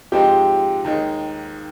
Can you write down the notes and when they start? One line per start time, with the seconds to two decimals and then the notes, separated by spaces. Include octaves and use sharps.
0.12 G#2 F3 G#3 C4 D#4 G4 G5
0.84 D#2 D#3 G#3 D#4